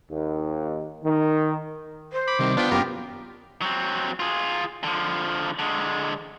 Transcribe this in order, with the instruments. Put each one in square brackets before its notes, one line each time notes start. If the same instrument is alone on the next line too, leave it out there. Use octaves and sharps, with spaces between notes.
[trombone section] D#2
D#3
[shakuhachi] C5
[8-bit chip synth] B5 [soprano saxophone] D6
[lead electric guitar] C3 G3 [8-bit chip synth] D#3
[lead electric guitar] B3 [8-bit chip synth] D4 F4 G5
[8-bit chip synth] F#2 F4 A#4 [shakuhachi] G4
[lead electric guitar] F#3 C4
F4 G#4
D3 F3
D3 G#3